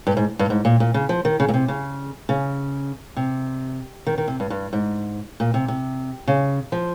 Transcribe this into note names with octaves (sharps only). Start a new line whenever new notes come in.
G2
G#2
G2
G#2
A#2
A#2
C#3
F3
D#3
C#3
A#2
C3
C#3
C#3
C3
D#3
D#3
C3
G2
G2
G#2
A#2
C3
C3
C#3
F3